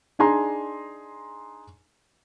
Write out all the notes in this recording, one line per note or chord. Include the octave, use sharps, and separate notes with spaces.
D4 D#4 G#4 G#5 A#5 C6